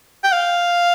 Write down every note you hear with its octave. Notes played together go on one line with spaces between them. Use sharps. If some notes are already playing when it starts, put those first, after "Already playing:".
G5
F5